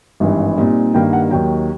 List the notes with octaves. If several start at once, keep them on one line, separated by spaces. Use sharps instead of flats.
G#1 G2 E3
A#2 G3 C4 D#4
G2 D#3 G3 A#3 G5
F#5
D#2 D#3 F#3 G5